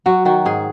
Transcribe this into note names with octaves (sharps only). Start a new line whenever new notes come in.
F#3 F#4
D#3 F#4
G#2 G#4